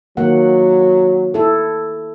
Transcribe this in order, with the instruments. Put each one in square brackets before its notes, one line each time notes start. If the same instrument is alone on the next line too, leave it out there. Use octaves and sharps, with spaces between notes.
[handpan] D#3 A#3 F#5 [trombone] F#3
[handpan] E4 A4